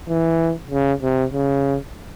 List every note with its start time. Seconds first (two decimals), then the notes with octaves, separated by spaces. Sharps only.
0.09 E3
0.71 C#3
1.02 C3
1.33 C#3